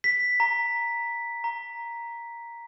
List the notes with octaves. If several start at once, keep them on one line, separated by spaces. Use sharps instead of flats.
B6
A#5
A#5